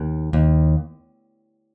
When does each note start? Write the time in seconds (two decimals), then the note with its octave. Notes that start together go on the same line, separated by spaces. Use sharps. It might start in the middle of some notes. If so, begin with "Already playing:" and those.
Already playing: D#2
0.33 D#2